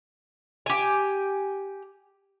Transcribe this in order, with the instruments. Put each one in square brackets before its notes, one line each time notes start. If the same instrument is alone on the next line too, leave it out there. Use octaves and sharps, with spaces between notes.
[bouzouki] G4 G#5